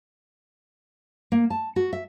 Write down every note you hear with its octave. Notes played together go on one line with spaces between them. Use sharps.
A#3
A5
F#4
E5